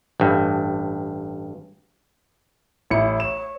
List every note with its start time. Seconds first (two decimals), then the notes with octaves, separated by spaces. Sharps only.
0.20 A1 G2
2.90 A1 E4 C#7
3.20 C#5 E7